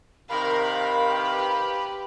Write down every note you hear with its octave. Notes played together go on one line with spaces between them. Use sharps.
C3 D#3 A#4 F5 B5
G4 B4